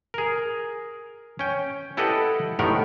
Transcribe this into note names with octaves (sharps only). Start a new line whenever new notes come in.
G#4 A#4
C#4 G5
E4 G4 A4 B4 D#5 F#5
A2 D#3 B3 G4 A#4 F#5